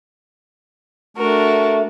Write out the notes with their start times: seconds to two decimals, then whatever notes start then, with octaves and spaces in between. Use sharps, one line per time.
1.17 A3 D4 F#4 A#4